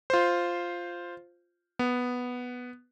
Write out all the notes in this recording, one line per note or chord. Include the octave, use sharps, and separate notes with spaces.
F4 C5
B3